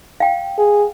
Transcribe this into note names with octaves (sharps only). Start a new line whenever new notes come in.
F5 G5
G#4